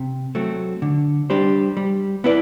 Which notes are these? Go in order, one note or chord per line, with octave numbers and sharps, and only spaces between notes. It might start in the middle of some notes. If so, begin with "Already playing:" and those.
Already playing: C3
F#3 A3 C4
D3
G3 D4 G4 C5
G3
B3 E4 B4 D5